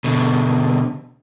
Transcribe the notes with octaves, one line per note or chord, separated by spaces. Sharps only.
B2 D3